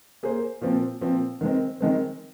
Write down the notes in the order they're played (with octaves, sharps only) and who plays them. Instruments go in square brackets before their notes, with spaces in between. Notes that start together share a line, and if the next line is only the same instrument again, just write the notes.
[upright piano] A#3 G#4 C5
A#2 F3 C4
A#2 F3 C4
D#3 G#3 C4
D#3 G#3 C4